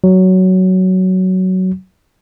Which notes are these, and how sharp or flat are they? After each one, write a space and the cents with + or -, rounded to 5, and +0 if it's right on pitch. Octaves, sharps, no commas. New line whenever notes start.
F#3 +10